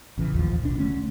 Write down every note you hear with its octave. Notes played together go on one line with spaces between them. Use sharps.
A1 C#3 E3
E1 A1 D#2 F3
D1 B1 D4
D3 A3 C#4